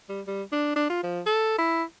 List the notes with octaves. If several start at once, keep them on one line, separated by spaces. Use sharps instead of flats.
G3
G3
D4
D4
F4
F3
A4
E4